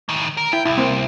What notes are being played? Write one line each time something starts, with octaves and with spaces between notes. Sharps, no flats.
A2 D#3
A#4
E4 G5
C2 E4
A#3 C4